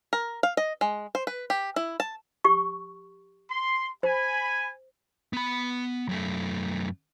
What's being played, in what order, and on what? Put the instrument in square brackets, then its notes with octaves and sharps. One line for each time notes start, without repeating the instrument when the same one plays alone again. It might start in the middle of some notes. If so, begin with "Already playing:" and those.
[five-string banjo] A#4
F5
D#5
G#3
C5
B4
G4
E4
A5
[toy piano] G4 C#6
[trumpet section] C6
[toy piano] C5 [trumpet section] G#5 B5
[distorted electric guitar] B3 B5
F#2 A3